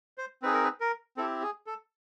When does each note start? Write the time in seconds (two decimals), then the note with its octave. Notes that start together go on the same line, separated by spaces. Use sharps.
0.18 C5
0.42 C4 D#4 G#4 B4
0.53 A#4
0.64 B4
0.80 A#4
1.17 C4 E4 G4 A4
1.43 G#4
1.67 A4